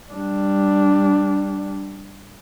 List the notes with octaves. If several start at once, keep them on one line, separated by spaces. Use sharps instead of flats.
G3 D4